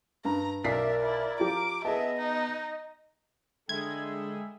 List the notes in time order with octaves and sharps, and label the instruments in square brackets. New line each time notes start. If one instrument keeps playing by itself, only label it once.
[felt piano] G2 [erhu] A#5
[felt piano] B1 B6 C7 [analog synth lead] A#4 [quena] D5 [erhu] E5
[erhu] E4
[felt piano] F3 G4 [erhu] D6
[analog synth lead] B3 [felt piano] G#4 A5 [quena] D#5 [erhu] E5
[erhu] D#4
[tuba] D3 [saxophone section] G3 A4 E5 [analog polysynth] G#3 G#4 [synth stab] G#6